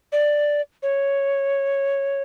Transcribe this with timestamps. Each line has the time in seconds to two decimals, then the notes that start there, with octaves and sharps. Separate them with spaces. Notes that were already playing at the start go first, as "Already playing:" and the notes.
0.12 D5
0.83 C#5